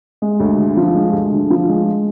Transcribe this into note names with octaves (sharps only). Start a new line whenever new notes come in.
G#3
D2
D3
F3
G#3
D2
D3
F3
G#3